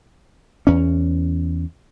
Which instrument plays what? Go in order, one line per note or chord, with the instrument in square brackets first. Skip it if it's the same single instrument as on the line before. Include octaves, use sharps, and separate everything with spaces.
[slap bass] E2 C#4